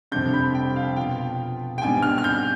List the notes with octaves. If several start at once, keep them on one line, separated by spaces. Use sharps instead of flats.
F1 F2 C3 G3 D4 G6
B5
G5
F5
B2 B3 F4 G5
G5
G#2 G3 B3 D4 G#5
F6
F6
G6